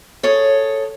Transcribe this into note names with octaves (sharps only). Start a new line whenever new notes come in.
G#4 A4 C#5